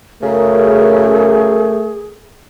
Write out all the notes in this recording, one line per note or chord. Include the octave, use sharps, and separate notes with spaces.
F#2 C#3 A3 G#4 A#4